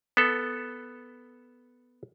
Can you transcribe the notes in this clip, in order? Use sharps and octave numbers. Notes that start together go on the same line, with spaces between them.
B3 A4